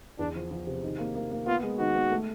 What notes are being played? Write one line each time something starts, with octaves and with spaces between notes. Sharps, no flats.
E2 D4
F3
F3
C3
D#3
A#3
A#3
A#3
B3 F4
G#3
D#3 F#4
B3
A3